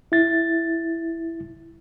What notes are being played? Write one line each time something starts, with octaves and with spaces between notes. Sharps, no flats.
E4 A6